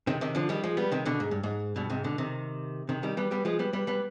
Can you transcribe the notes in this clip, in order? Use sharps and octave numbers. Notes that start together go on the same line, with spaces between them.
C3 D#3
C3 D#3
D3 F3
D#3 G3
F3 G#3
G3 B3
C3 D#3
B2 D3
G#2
G2
G#2
G2 B2
G#2 C3
B2 D3
C3 D#3
C3 D#3
D#3 G3
G3 B3
G3 B3
F3 G#3
G3 B3
G3 B3
G3 B3